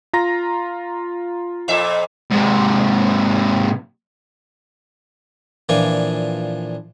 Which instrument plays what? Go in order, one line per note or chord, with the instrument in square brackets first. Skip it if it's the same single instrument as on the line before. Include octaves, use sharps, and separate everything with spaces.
[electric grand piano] F4 A#5 A#6
[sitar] F2 A#2 E5
[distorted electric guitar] G#2 C3
[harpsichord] A#2 E3 F3 D4 D5 G#5